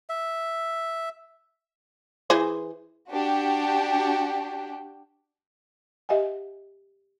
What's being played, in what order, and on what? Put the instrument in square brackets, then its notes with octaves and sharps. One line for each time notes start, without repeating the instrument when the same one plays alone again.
[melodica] E5
[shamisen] E3 G#4 C5
[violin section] D4 F#4 G4
[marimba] G4 D#5 E5 F#5 G#5